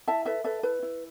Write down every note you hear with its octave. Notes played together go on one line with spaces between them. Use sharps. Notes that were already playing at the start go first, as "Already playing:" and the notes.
E4 E5 A5
A4 B4 E5
A4 B4 E5
E4 B4
E4